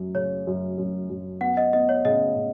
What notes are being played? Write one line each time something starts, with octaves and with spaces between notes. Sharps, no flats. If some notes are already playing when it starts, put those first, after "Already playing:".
Already playing: F#2 F#3
C#3 C#5
F#2
F#2
F#2
B3 F#5
D#5
B3 D#5
C#5
C#3 D#5
C#3